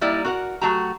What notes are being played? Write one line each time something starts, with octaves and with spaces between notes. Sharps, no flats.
G3 A#3 D#4 E4 D5
F#4 A#4 F#5
F#3 A3 F#4 G4 A#5